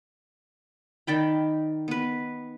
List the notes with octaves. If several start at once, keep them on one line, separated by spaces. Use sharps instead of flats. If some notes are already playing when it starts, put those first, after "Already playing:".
D#3 D5 G5 B5
B3 B4